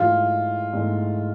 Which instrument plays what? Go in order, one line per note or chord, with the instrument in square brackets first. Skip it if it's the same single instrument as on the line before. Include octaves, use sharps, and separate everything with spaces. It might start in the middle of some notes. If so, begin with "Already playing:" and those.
Already playing: [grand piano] G#2 E3 A3 [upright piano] F4
[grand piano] G#2 E3 A3